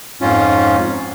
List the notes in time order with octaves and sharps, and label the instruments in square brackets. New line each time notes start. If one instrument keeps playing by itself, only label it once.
[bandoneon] F2 G#2 C#4 F4